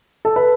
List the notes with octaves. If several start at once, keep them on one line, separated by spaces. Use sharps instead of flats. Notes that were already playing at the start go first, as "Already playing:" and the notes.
A4
B4